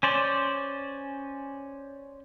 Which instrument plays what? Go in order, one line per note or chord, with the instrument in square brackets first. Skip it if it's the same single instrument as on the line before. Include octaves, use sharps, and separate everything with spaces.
[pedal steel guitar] C#4 C5 D5